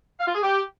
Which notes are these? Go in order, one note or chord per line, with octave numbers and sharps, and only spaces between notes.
F5
F4
G#4
G4